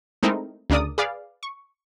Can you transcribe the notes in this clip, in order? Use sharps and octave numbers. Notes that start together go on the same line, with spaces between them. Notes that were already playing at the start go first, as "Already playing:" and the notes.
G#3 A3 C4 D#4 E4 A#4
D2 C#3 D4 A#4 D5 D#6
G#4 B4 D5 F5
C#6